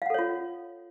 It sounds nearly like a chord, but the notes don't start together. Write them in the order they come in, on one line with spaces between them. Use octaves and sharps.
F5 F#5 A4 C#5 F4